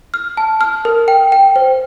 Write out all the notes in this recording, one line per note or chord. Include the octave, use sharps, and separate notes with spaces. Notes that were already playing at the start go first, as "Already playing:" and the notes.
F6
A5
F6
A#4
G5
G5
C5